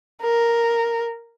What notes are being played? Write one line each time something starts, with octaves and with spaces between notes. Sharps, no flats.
A#4